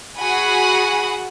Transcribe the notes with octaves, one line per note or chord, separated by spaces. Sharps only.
F#4 G#4 F#5 G#5 B5